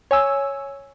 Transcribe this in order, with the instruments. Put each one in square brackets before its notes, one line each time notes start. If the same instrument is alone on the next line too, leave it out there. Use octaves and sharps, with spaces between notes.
[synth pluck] C#5 G#5 E6